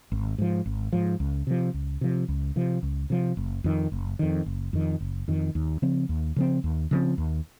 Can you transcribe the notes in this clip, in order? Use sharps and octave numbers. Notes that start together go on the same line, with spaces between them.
G#1
G#2 F3
G#1
G#2 F3
C#2
C3 F3
C#2
C3 F3
C#2
C3 F3
C#2
C3 F3
F#1
F2 D#3
F#1
F2 D#3
F#1
F2 D#3
F#1
F2 D#3
D#2
C#3 F3 C4
D#2
C#3 F3 C4
D#2
C#3 F3 C4
D#2